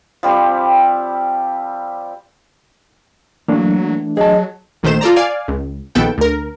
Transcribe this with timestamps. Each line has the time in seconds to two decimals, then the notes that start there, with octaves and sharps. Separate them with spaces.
0.23 F3 G3 C4 G4
3.48 E3 F#3 A3 A#3 D4
4.17 F#3 G#4 D#5 A5
4.83 A#1 D#3 A3 C5 E7
5.01 F4 A4 D5 A#5
5.16 D5 F5 G#5
5.48 C#2
5.95 A#1 D#3 B3 A4 G5
6.18 D2 A#4